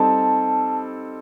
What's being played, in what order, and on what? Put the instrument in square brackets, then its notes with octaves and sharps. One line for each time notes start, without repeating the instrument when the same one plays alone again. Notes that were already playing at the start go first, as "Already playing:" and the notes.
Already playing: [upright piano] G3 C4 D#4 A4 [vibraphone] A5